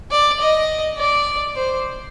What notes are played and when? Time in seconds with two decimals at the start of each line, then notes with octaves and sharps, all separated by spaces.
0.11 D5
0.40 D#5
0.98 D5
1.56 C5